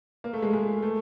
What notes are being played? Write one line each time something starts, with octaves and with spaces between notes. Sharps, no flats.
A#3
A3
G#3
G#3
A3